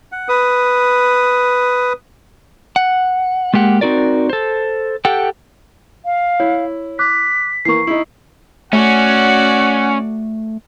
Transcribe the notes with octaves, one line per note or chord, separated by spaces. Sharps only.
F#5
B4 D#6
F#5
G#3 A#3 G4 F#5
C4 D#4 F#4 A#4 D5
A4 C5
G4 A4 F#5 G5
F5
E4 C#5
D6 F#6 B6
E3 A#3 C#6 C7
D#4 E4
A3 C#4 F#4 D5 F#5